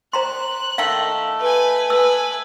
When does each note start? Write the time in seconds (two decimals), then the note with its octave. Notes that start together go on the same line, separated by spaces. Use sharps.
0.13 C5 A#5 C6 F#6
0.78 D#3 A3 F5
1.40 B4 G#5
1.90 B4 G#5 E6